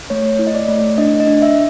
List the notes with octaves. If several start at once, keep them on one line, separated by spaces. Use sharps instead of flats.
A3 C#5
E4
D#5
D5
A3
D4 D#5
D#5
D4
E5